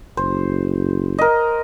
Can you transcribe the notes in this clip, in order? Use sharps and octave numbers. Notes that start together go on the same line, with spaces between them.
F#1 C5
A#4 D#5